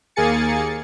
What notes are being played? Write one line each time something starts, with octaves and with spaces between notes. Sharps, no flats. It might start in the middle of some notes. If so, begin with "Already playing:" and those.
D#2 A#3 G#4 G#5 A6 C#7